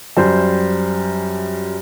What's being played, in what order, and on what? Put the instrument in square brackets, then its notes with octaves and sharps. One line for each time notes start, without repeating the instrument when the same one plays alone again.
[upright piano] F#2 G3 C5